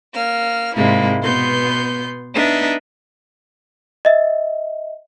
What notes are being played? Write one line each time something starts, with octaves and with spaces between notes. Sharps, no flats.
A#3 F6
G#2 C3 G#3 A#3 E4
B2 B3 C6 G6
B3 D4 D#4 E5
D#5 E5